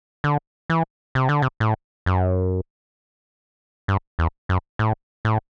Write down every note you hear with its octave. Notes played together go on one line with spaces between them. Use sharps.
D3
E3
C3
D3
C3
A2
F#2
G2
E2
F#2
A2
A2